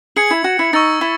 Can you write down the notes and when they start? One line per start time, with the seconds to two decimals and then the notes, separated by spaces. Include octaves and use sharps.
0.16 G#4 G#6 C#7 F#7
0.31 E4
0.44 F#4
0.59 E4
0.73 D#4 C#6 E6 A6 C#7
1.01 E4